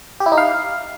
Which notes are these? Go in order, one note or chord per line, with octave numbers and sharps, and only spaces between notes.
G4
E4
D#4
F5